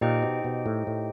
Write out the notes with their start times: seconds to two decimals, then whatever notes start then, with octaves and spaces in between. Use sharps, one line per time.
0.01 A#2 D#4 G4 C5 D#5 G5
0.22 B2
0.44 B2
0.66 A2
0.87 A2